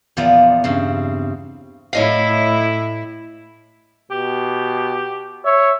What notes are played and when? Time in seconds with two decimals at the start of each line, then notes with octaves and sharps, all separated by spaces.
0.17 E2 A#2 F3 B3 F4 D5
0.64 G2 C#3 C4
1.93 A2 E4 C#5 D#5 F5
4.11 B2 G4
5.45 C#5 E5